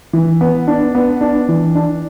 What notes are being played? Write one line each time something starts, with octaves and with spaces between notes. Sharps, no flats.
E3
B3
D4
B3
D4
E3
D4